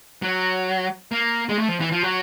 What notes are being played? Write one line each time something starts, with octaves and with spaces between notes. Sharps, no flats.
F#3
A#3
G#3
A3
F3
E3
F3
F#3